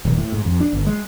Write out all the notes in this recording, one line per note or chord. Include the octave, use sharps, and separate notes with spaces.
D#1
A2
G#2
F2
D4
G1
G#3